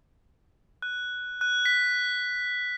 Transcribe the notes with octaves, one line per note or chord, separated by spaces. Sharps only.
F#6
F#6
B6